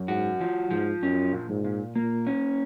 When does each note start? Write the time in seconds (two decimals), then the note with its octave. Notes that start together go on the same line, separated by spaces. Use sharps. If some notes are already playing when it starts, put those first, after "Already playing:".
Already playing: F#2
0.08 G#2 F#4
0.41 F3
0.71 G#2 F3
1.02 F#2 C#4
1.33 A#2
1.49 G#2
1.64 A#2
1.95 A#2 A#3
2.27 C#4